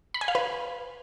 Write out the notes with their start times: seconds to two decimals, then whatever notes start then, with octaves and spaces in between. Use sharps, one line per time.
0.14 B5
0.21 G#5
0.28 F5
0.35 B4